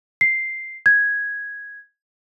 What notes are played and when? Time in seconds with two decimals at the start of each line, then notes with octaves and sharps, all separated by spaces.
0.21 C7
0.86 G#6